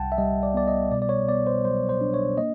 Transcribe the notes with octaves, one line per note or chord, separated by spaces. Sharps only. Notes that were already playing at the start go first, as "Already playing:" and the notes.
Already playing: C2 G3 F#5 G5 A5
E5
G3 D#5
D5
B3 D5
D#5
B2 D5
D5
C#5
B3 D5
C5
F#3 C5
C5
D4
C#5
A#3 D#5